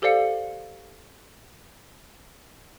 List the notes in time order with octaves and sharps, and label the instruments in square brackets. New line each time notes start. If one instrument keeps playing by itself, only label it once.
[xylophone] G4 A4 C5 D5 F5 C#7